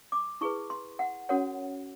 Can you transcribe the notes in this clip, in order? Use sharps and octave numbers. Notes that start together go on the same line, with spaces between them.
D6
E4 G#4 B4 C#6
C6
F#5
C#4 F#4 A#4 C#5 F#5